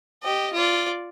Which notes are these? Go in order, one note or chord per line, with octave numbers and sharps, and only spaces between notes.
G4 D#5
F4 D5